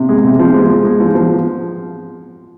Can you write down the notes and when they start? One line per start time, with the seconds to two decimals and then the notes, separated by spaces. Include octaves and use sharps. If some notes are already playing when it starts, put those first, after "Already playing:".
Already playing: C3
0.09 G#3
0.24 C3
0.39 F3
0.54 G#3
0.70 G#3
0.85 G#3
1.00 F3
1.15 F3